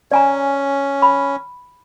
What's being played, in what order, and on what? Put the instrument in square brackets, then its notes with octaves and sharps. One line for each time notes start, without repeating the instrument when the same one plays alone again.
[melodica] C#4 [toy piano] D5 G#5 A#5
[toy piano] B5